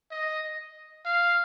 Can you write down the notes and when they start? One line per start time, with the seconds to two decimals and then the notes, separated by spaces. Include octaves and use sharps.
0.11 D#5
1.05 F5